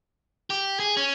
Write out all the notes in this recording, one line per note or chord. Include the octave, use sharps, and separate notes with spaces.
G4
G#4
C#4